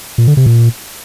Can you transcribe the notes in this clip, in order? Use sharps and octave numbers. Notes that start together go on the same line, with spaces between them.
A#2
D3
C3
A#2